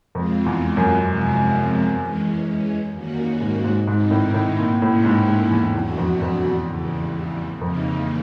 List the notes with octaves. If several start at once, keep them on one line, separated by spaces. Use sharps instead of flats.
F2 G#3 C4 F4
E2
F#2
C3 F3 G#3 C4
E3 G#3 C#4
D#3 G3 A#3 C#4 F#4
G#2
G#2
G#2 D#3 G3 C4 D#4
A2
A2
A#2
A2 A#3 C#4 E4
G#2
G#2
E2
E2 F#3 A3 D4 F#4
F2
F2
E2
C#3 E3 G3
F2 C#3 E3 G3 A#3 D#4